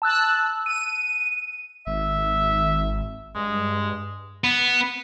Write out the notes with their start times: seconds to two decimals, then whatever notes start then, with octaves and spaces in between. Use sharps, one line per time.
0.02 A5 E6 F#6
0.66 D#7
1.87 G#1 E5
3.35 G2 G#3
4.44 B3